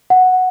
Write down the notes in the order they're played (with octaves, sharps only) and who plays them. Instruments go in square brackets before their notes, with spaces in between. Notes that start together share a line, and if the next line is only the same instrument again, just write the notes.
[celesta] F#5